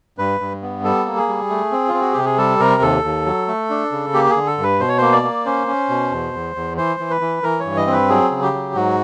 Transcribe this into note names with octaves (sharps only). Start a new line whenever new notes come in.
G2 B4
G2
B3
G3 A4
A#3
G#4
G3
A3
C4
F4
C4
F#4
C3 G4
G#4
G3 A4
C3 A#4
D#2 A4
D#2
F#3
A3
D4
C#3
A#3 G4
G#4
D3
A4
G2
B4
B2 C5
C#5
A#3 C5
D5
A#3
C#4 C5
C#4
B2
E2
E2
E2
E3 C5
E3
B4
E3
E3 A#4
C#5
G2
D#5
C4
B4
F#3 G#4
C#3
G4
F#3
G#2 F#4